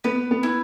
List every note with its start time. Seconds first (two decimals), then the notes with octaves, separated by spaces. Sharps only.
0.04 B3 B4
0.31 B3
0.43 E4